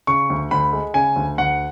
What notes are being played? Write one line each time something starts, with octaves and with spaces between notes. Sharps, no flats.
C#3 C#6
D2
D2 B5
G#3
C#3 G#5
D2
D2 F#5